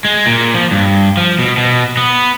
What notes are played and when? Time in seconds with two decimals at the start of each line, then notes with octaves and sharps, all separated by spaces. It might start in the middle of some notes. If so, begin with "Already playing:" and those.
0.05 G#3
0.26 A#2
0.55 F3
0.71 G2
1.17 F3
1.39 B2
1.57 B2
1.97 B3